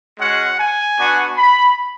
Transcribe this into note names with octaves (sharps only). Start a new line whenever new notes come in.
G#3 C#4 F#4 F#5
G#5
B3 D4 F#4
B5